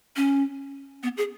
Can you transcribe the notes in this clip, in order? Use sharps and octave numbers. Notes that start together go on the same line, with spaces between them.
C#4
B3
G#4